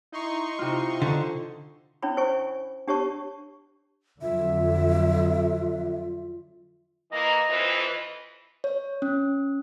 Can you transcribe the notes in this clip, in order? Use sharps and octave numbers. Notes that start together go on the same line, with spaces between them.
D#4 E4 C6 C#6
C3 F4
D3 A4
C#4 D4 E4 C#5 B5
E4 C5 C#5 G#5 C#6
D4 G4 C#5 A5 C#6
F2 D3 F#3 F4 E5
E3 A#3 D#5
F2 E3
C#5
C#4